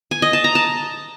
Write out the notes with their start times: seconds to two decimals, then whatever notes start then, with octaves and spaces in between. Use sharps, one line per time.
0.11 G#5
0.22 D#5
0.33 A5
0.44 A#5
0.55 A5